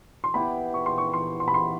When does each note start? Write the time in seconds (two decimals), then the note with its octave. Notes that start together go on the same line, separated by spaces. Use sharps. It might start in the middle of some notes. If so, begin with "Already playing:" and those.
0.24 C6
0.34 B3 E4 G4 B5
0.74 C#6
0.86 C6
0.98 C#6
1.13 C6
1.40 C6
1.48 B5
1.54 C6